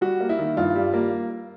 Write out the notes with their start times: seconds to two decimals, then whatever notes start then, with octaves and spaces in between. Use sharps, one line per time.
0.01 G3 F#4
0.21 A#3
0.29 E4
0.39 D#3
0.57 G2 F4
0.76 G3
0.94 A#3